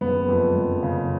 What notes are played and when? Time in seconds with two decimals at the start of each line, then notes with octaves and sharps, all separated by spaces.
0.01 F#1 B3
0.28 F2
0.56 F#1
0.83 C#3